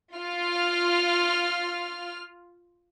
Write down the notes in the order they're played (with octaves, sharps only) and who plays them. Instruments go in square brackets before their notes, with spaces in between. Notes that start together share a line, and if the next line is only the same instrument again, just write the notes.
[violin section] F4 F6